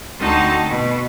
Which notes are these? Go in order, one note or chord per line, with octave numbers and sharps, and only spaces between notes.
D2 C4 D#4 F#4 A5
B2